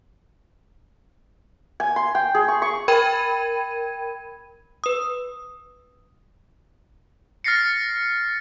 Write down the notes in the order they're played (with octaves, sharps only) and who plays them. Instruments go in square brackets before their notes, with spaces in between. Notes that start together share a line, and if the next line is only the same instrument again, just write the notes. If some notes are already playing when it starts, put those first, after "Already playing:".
[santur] G#5
C6
G5
G#4
C#6
C#6
[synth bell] A#4 G5 B5 G#6 D#7
[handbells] B4 D#6
[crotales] F6 A6 A#6 C7 C#7